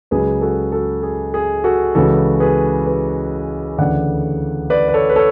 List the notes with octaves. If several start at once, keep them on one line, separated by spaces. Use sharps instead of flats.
C#2 C#3 F#3 G#4 B4
F#4 A4
F#4 A4
G#4
G#4
F#4 A4
C#2 C#3 E3 F#4 A4
G#4 B4
G#4 B4
D2 C#3 E3 D5 F#5
B4 D5
B4
A4 C#5
B4
A4 C#5